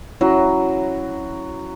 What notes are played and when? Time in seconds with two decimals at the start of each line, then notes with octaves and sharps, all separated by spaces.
0.21 F#3 C#4 E4